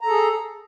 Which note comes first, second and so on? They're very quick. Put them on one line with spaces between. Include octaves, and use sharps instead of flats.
A#5 A4 G#4